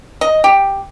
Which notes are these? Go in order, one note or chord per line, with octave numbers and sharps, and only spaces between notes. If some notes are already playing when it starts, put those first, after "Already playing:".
D#5
G4